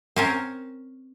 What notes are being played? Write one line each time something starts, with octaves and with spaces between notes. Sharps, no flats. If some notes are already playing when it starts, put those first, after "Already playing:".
C4 C#4 A#4